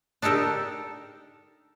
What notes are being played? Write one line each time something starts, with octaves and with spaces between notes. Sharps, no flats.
D4 D#4 G4 A4 A#4